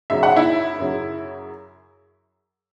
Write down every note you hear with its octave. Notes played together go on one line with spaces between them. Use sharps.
F#2 C#3 F#3 E5
F#5
E4 E5
F#2 C#3 F#3